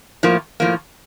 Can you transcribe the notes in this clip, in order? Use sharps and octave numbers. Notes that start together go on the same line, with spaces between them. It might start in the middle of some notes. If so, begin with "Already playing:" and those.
A2 F3 A#3
A2 F3 A#3